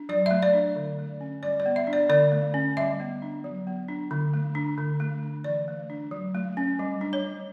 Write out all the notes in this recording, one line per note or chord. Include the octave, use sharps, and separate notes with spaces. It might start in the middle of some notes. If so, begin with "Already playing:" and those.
Already playing: D4
F#3 D5
A3 E5
D5
D4
D3
A3
C#4
G3 D5
D5
B3
E5
D4
D5
D3 D5
A3
C#4
G3 E5
B3
D4
F#3
B3
D4
D3
A3
D4
D3
A3
D4
E3 D5
A3
D4
F#3
A3
C#4
G3
D4
C#5
G3